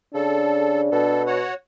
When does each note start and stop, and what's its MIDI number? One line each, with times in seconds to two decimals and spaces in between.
0.14 0.89 49
0.14 1.42 62
0.14 0.81 69
0.92 1.43 47
0.92 1.23 69
1.27 1.54 66
1.27 1.54 73
1.27 1.54 78